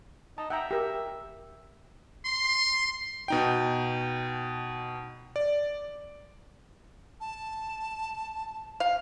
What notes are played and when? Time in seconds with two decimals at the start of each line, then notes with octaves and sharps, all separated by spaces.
0.38 D#4 A5
0.50 E5 F#5 G5 A#5
0.71 G4 A#4
2.26 C6
3.28 B2 D#4 G5
5.36 D5
7.20 A5
8.80 F5